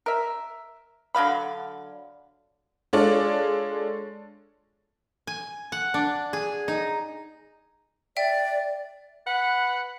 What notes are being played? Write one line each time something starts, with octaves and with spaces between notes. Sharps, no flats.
A#4 E5
D3 F#3 F5 B5
G#3 D4 F4 A4 C#5 D5
G#5
F#5
D4
G#4
D#4
D5 E5 G5
B4 F#5